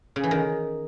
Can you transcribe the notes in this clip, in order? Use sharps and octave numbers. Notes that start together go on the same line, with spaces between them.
C#3
E3
D#3